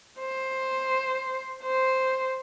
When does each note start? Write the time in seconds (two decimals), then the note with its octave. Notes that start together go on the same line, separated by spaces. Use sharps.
0.20 C5
1.64 C5